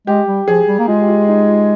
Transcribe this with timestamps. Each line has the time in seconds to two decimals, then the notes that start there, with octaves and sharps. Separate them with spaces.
0.07 G#3 G4
0.27 G3
0.47 F3 G#4
0.68 G3
0.79 A#3
0.88 G#3 F4
1.02 G4
1.08 F4
1.28 D#4
1.48 F4